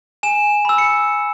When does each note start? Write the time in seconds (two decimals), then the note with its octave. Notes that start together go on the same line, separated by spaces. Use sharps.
0.23 G#5 E7
0.65 B5 E6
0.78 C#7